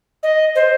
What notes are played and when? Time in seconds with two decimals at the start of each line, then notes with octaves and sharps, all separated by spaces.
0.23 D#5
0.55 C5